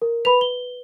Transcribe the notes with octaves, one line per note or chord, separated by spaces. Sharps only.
A#4
B4 B5 F7
G7